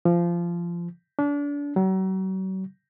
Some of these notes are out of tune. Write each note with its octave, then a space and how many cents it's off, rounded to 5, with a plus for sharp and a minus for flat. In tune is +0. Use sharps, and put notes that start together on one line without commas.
F3 -20
D4 -30
F#3 +40